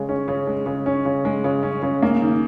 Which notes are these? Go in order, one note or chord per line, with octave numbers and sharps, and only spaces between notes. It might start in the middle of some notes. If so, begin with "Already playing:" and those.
Already playing: C#3 G#3
C#4
C#3
G#3
C#3
C#4
C#3
G#3
C#3
C#4
C#3
A#3
D#3